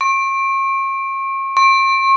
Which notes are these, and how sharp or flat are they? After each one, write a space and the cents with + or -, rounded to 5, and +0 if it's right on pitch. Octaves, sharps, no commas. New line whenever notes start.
C#6 -40
C#6 -45